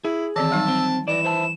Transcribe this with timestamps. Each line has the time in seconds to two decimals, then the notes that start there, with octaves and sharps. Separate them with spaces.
0.05 E4 G#4
0.36 D#3 E3 C4 A5 E6
0.51 F#3 G3 D#4
0.68 C4
1.08 E3 D5 D#5 E7
1.24 C5 E5 A5